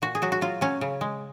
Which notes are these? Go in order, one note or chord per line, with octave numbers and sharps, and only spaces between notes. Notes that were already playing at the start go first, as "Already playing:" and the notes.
A#2 F#4
G#4
F#3 F#4
F#4
F#3 F4
F#3 C#4
C#3
G#3